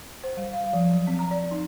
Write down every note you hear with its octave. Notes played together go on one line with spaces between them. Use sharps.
C5
G3
F5
F3
F#3
C4
A#5
D5
D#4